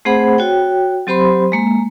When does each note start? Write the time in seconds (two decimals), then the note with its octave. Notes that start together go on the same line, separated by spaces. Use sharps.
0.05 A3 C4 G#4 C5 F#5 B5
0.38 F#4 C#5 G5
1.07 F#3 C4 G4 C5 B5 C6
1.52 G#3 A#3